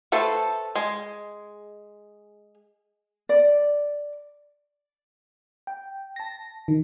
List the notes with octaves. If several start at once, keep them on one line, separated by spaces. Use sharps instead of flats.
A3 A4 B4 C5
G#3
D5
G5
A5 A#6
D#3